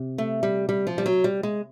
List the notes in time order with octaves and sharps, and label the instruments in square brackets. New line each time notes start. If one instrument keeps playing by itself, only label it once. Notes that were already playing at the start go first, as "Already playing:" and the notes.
Already playing: [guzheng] C3
[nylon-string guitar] A3
G3
G3
F3
G3
F#3
G3
G#3